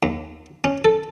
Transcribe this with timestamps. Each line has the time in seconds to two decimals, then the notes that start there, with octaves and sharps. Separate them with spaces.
0.03 D#2
0.64 C#4
0.85 A4